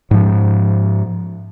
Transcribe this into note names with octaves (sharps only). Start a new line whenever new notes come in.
G#2 F3